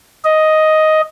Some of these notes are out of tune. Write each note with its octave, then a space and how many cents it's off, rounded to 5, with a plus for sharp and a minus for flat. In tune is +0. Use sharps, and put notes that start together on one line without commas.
D#5 +5